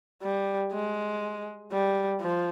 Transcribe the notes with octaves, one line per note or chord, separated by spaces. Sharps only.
G3
G#3
G3
F3